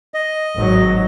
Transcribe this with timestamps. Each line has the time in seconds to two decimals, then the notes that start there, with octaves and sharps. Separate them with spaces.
0.14 D#5
0.56 G#1 F#3